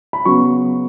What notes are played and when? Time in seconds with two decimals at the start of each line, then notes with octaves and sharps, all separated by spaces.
0.13 B5
0.25 C#3 F#3 B3 C#6